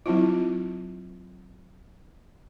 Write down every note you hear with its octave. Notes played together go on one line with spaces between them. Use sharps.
F#3 C4 E4 F4